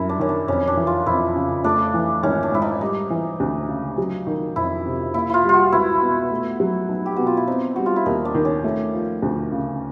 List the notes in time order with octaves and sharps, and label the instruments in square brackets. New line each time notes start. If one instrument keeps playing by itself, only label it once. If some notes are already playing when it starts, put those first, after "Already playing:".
Already playing: [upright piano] F#2 G3 [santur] E4
[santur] D4
[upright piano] D#3 [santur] C#4
[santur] D4
[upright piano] F2 [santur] C#4
[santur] D4
[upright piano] E3
[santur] F4
[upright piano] F2 [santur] E4
[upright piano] C#3
[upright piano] A3 [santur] D4
[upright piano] E3
[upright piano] G#1 [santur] C#4
[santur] D4
[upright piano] G#2 [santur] E4
[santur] D#4
[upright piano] G3 [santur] D#4
[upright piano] E3
D2
C#3
F#3
D#3
[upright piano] F2 [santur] E4
[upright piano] C3
[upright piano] A#3 [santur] E4
[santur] E4 F4
[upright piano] G3
[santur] F4 F#4
[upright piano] C#2 [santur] E4
[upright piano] B2
A3
F#3
B1
[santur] G4
[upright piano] B2 [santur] F#4
[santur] F4
E4
[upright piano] C4 [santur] D#4
[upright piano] G3 [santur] F#4
[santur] F4
E4
[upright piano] D#2 [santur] D#4
[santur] D4
[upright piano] D#3
[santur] C#4
[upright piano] A3
F3
D2
C#3